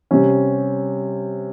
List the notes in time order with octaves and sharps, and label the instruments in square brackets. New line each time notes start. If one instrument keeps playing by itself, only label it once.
[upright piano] C3 G3 C#4